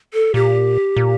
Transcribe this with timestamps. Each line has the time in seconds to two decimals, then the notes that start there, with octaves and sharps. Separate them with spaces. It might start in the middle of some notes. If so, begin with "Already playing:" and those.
0.13 A4
0.34 A#2 G4
0.96 A#2